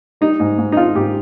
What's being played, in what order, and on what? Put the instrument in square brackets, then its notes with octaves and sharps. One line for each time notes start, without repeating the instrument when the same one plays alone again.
[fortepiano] G3 D#4
G#2
G#2
D#4
G#1 F4
G#2 G4